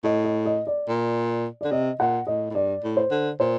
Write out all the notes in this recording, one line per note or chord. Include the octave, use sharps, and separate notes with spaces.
A2 D#5
D#5
D#5
D5
A#2
D3 D5
C3 D#5
A#2 F#5
A2 D#5
A2
G2 D5
A2
C5
D3
A#2 C5